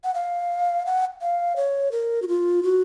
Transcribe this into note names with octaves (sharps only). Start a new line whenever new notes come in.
F#5
F5
F#5
F5
C#5
A#4
F#4
F4
F#4